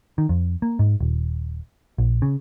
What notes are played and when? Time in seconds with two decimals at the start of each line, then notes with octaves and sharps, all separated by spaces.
0.18 D#3
0.29 F2
0.62 A#3
0.79 G#2
1.00 D#1
1.98 A#1
2.22 C#3